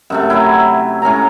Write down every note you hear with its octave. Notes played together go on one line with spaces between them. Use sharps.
F#2 C3 A3
C3 F#3 E4
A2 C#4 C#5 A#5